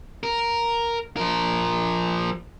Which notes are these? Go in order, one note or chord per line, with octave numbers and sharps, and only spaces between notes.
A#4
F3 A#4